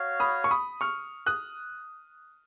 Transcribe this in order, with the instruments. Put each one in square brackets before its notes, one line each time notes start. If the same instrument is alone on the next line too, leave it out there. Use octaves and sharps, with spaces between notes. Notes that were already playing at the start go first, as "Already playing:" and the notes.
Already playing: [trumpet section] F#4 C#5 F5
[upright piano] B5 D#6
C#6
B5 D#6
C#6 F6
D#6 F#6